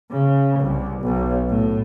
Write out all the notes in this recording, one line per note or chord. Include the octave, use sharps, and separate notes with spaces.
C#3
C2
B1
A2